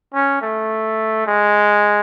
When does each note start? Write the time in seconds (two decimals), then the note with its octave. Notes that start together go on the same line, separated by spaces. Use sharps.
0.14 C#4
0.41 A3
1.27 G#3